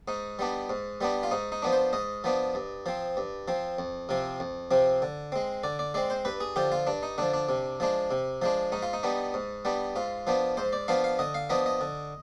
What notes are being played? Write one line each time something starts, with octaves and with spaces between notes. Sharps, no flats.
G#2 D#4
G3 B3 D4
G#2
G3 B3 D4
F4
G#2 D#4
D#4
F3 B3 D4
C5
G#2 D#5
F3 B3 D4
G2
F3 C4
G2
F3 C4
F2
C3 F3 C4
F2
C3 F3 C4
D3
G#3 C4
D3 D5
D5
G#3 C4 D5
C5
G2 B4
G#4
D3 F3 G4
F4
G2 D4
D#4
D3 F3 D4
D4
C3
F3 G#3 D4
C3
F3 G#3 D4
G#2 D#4
F4
D#4
G3 B3 D4
G#2
G3 B3 D4
G#2 F4
F3 B3 D4
G#2 C5
D5
F3 B3 D4 F5
F5
D3 D#5
F5
F3 B3 D4 D#5
D#5
D3